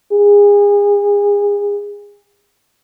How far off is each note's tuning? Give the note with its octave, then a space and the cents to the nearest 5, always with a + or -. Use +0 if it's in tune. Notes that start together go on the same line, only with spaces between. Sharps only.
G#4 -30